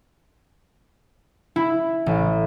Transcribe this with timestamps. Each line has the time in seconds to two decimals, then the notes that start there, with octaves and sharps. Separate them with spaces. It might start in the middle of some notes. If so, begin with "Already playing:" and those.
1.56 E4
2.06 A1